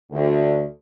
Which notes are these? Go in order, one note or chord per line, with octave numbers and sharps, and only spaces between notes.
D2